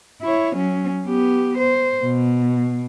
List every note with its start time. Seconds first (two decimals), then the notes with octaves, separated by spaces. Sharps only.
0.22 E4 C#5
0.56 F#3 C#4
1.07 B3 G4
1.58 C5
2.04 B2